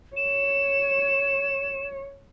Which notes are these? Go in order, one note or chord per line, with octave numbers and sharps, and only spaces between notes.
C#5 E7